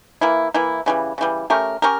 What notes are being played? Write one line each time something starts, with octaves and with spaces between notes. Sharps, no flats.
E3 A#3 E4
E3 A#3 E4
C#3 E3 G3
C#3 E3 G3
A3 C#4 G4 A#4
C#4 G4 A#4